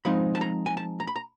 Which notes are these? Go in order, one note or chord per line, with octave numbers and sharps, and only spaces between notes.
F3 G#3 C4 D#4 B5
A5
A#5
G#5
A5
A#5
B5
A#5